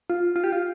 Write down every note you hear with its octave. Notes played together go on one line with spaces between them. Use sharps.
F4
F4
G4
F4